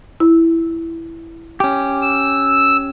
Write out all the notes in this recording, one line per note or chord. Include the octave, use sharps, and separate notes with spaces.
E4
C#4 G4
E6